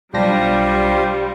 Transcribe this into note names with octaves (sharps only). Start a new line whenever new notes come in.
B1 G3 D4 F4 G4 C5 A#6